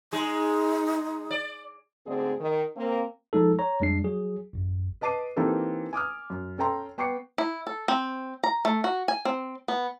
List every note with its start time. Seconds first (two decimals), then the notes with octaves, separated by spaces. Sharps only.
0.13 G#3 D#4
1.31 D5
2.07 D2 G#2 D3 C4 G#4 D5
2.40 D#3
2.77 A#3 C4
3.33 F3 G#3 D#4 A4
3.59 C#5 A#5
3.80 F2 G3 G#3 D4 C7
4.04 F#3 G#4
4.53 A1 F#2
5.01 B4 D#5 A5 D6 C7 D#7
5.36 E3 A#3 C4 D#4 G4 A4
5.93 G#5 D6 D#6 F6
6.30 F#2
6.58 C#4 A4 G5 A#5 C6
6.98 B3 G5 C#6 D6 C7 C#7
7.38 E4
7.67 A4
7.88 C4
8.43 A#5
8.65 A3
8.84 F#4
9.08 G#5
9.25 C4
9.68 B3